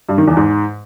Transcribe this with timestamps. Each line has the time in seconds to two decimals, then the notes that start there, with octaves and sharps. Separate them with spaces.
0.09 G2
0.18 D#3
0.27 E2
0.37 G#2